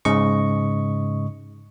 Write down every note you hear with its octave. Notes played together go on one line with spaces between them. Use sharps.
G#2 C#3 D#5 C#6